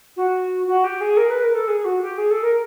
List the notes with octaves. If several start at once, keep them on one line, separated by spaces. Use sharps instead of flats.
F#4
F#4
G4
G#4
A#4
B4
A#4
A4
G#4
F#4
G4
G#4
A4
A#4